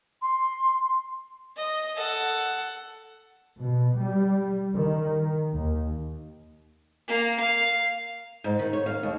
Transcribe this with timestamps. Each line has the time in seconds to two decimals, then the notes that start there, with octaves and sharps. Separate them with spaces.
0.22 C6
1.57 D#5
1.97 A4 F#5
3.58 B2
3.98 G3
4.74 D#3
5.54 D#2
7.08 A#3
7.40 F5
8.44 G#2
8.59 D#3
8.73 C#5
8.86 F5
9.03 D#2